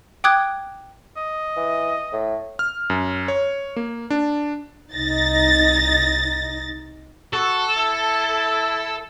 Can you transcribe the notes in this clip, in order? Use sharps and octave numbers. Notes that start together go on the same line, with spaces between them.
G5 D6 D#6 F#6 G#6
D#5
E3
A2
F6
F#2
C#5
A#3
D4
C2 D#4 A6 A#6
F#4 A4
E4